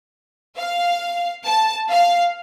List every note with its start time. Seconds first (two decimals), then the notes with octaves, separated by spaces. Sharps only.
0.56 F5
1.46 A5
1.90 F5